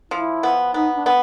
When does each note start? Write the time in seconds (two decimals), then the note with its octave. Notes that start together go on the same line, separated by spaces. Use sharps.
0.11 F3 E4
0.43 B3
0.74 B3 D#4
0.95 D4
1.06 B3